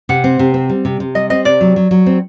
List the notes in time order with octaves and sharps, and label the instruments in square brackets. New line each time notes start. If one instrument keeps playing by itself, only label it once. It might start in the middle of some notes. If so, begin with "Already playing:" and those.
[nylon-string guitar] C3 [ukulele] F#5
[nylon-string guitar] C4
C3
C4
G3
C3
C3
[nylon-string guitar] G3 [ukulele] D#5
[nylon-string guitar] C4 [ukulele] D#5
[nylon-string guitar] C3 [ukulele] D5
[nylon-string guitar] F#3
F#3
F#3
C4